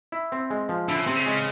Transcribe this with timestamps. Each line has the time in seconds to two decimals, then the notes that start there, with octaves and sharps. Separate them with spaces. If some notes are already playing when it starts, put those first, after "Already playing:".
0.12 E4
0.32 C4
0.50 G#3
0.69 F3
0.88 D3 E4
0.98 C#3
1.06 C3 C4
1.16 C#3
1.26 G#3